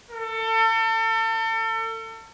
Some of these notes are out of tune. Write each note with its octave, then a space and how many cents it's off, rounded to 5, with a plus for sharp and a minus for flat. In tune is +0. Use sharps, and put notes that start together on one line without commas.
A4 +35